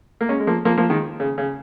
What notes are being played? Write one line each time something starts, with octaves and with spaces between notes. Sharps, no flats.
A#3
G#3 C#4
G#3
F3 A#3
F3 A#3
F3 A#3
D#3 G#3
C#3
C#3